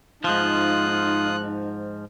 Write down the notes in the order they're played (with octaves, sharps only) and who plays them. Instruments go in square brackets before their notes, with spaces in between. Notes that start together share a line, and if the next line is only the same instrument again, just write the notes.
[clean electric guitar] G#2 F3 [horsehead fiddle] D#4 [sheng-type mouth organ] F4 D#6 [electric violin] F#6